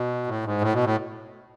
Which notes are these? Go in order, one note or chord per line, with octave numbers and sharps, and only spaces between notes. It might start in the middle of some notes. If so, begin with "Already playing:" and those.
Already playing: B2
A2
G#2
A2
B2
A2